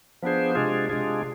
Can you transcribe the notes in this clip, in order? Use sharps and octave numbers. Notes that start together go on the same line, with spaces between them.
F3 B3 D4 G#4 C5
C3 G#3 D4 F4 G#4
C3 G#3 D4 F4 G#4